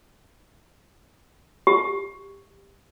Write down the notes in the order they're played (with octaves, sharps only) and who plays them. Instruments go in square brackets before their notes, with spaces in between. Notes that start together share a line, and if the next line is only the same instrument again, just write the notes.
[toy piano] G4